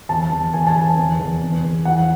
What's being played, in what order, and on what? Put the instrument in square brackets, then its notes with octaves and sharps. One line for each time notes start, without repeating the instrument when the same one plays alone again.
[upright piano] E2 A5
E2
E2 G#5
A5
E2 G#5
E2
E2
E2
E2
E3 F#5